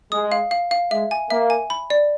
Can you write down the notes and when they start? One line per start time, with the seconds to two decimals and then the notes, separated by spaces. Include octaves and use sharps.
0.12 G#3 D#6
0.32 F5
0.51 F5
0.71 F5
0.91 G#3 E5
1.11 G#5
1.30 A#3 E5
1.50 G#5
1.70 B5
1.90 D5